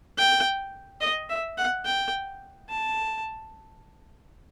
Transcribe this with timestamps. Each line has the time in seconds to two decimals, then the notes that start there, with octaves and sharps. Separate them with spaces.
0.18 G5
1.01 D#5
1.30 E5
1.58 F#5
1.85 G5
2.70 A5